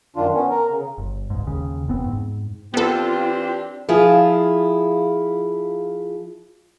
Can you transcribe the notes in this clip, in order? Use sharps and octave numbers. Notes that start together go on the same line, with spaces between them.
F#2 D#3 D4 F4
B3 C#4
A#4
C#3
G1
C#2 G#2
D#2 C#3
E1 B3 C4
G#2
E3 B3 C4 D4 F4 G4 A4
F3 E4 F4 G#4